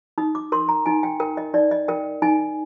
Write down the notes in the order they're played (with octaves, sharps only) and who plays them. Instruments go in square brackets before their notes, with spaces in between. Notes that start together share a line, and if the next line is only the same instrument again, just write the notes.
[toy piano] D#4 D#6
D6
A#4 C6
A#5
D#4 G#5
G5
A#4 G5
D#5
D#4 D5
D#5
A#4 G5
D#4 G#5